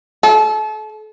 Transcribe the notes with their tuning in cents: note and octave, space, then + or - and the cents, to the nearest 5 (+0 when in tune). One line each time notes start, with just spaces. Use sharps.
A4 -35